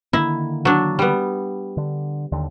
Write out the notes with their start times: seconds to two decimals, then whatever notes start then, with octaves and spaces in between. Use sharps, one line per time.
0.13 D3 D#3 A#3 E4
0.65 F#3 D4
0.99 G3 B3
1.77 D3
2.32 D#2 D3